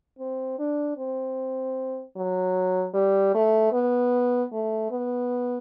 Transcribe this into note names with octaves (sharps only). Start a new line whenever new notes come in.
C4
D4
C4
F#3
G3
A3
B3
A3
B3